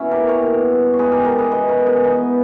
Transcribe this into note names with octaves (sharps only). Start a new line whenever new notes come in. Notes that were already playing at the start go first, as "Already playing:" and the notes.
Already playing: B2 C#4 E4
G4 A#4
A#3
A#4 C#5
B2
G3
C#5
G#3 G#4 B4
G4 A#4
G#3 G4 A#4
G#4 B4
B2 B4 D#5
A#4 C#5
B2
G#4 B4
E3 B3 D#4